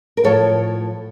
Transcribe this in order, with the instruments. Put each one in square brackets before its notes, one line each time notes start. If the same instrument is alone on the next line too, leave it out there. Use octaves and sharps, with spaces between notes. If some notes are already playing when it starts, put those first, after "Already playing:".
[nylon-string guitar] A#4
A2 F3 A4 C#5